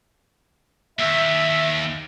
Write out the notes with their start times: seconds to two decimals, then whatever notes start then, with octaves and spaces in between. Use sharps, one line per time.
0.99 D#2 E5